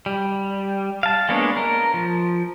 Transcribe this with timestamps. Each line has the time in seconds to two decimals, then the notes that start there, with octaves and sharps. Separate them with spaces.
0.06 G3
1.03 F5 A5
1.29 G#3 A#3 B3 D4 C#5
1.57 A#4
1.94 F3